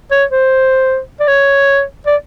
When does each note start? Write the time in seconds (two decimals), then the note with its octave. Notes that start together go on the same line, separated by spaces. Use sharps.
0.11 C#5
0.31 C5
1.20 D5
1.28 C#5
2.07 D5